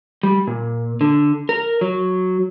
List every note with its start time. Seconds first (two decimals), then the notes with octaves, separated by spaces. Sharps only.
0.23 G3
0.47 A#2
1.01 D3
1.49 A#4
1.81 F#3